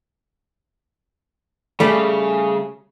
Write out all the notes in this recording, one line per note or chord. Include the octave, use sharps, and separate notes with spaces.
C#3 G3 A3